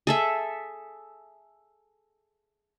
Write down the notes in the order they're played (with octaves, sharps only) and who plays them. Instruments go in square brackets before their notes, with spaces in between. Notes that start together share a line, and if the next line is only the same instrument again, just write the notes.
[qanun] G#4 A4 E5